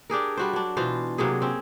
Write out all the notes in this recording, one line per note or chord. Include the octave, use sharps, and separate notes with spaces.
D4 G4 G#4 A#4
G3 F#4 C5
F#3 D4
B2 E3 F4 C5
C3 F#3 A#3 G#4
C4 C#4